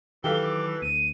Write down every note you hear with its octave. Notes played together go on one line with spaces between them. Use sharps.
D#3 E3 F#3 G4 A4 F5 G7
D6
D2 D#7